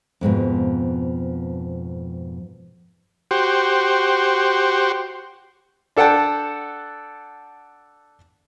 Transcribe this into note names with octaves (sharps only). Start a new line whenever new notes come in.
F2 G#2 B2 F3
F#4 G4 C5
D4 A4 F#5 G5 A5